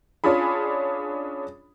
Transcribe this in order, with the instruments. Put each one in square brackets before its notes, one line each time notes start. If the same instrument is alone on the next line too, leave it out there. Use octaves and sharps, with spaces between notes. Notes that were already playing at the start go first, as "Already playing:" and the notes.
[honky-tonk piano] C#4 D4 F4 G#4 B5